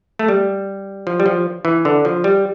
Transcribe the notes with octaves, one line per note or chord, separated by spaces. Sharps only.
A3
G3
F3
G3
F3
E3
D3
F3
G3